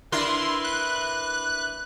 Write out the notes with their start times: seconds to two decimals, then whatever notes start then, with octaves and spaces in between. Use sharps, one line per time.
0.12 D4 E4 A#4 B4 E5 C6
0.64 F#6